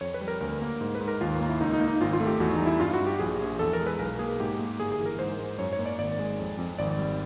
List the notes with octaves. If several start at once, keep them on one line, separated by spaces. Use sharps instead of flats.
F2 C#5
B4
G3
A#4
D2 A#4
A#3
G#2
B4
G#2
A#4
D#2 F4
A#3
E4
C#2 D#4
D#4
A#3
D#4
G#1 F4
F4
A3
G4
E2 F#4
D#4
G3
E4
G2 F4
F#4
G2
G4
A#1 G#4
A#1
E2 A4
A#4
G#3
B4
B1 A#4
A#3 G#4
G#2 G4
A#3
G1 G#4
G#4
E3
A#4
G#2 C5
G#2
F#2 C#5
C#5
A#3
D5
G#1 D5
G#3
F2
F2
G#1 D5
G3